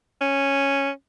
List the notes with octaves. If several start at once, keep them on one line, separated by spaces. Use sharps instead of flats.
C#4